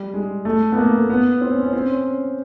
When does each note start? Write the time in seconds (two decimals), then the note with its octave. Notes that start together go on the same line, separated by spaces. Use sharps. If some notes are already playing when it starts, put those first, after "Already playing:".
Already playing: G3
0.14 G#3
0.45 A3
0.72 B3
0.78 A#3
0.93 A3
1.10 B3
1.41 C4
1.52 C#4
1.63 C#4
1.73 C4
1.89 C#4